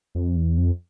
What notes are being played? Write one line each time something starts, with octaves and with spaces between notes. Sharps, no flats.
F2
E2
F2